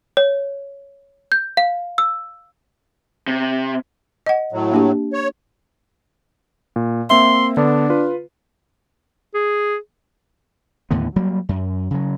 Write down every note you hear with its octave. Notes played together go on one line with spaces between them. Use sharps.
C#5
G6
F5
E6
C3
D#5 F#5
A2 F#3
A#3 D4 G4
C#5
A#2
A#3 C4 E5 C6
D3 B3 D4
F4 B4
G#4
D#2 A2 D3 B3
F#3 G3 A#3
F#2
C#3 F#3